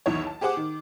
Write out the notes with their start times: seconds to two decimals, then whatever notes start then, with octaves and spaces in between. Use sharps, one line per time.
0.06 B1 E2 D#3 E4 C#5
0.27 A5
0.41 G4 G#4 C5 F#5 D6
0.57 D#3